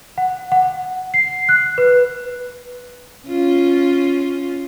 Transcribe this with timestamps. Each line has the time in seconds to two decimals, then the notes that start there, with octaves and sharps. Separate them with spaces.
0.18 F#5
0.52 F#5
1.14 C7
1.49 F#6
1.78 B4
3.28 C#4 F4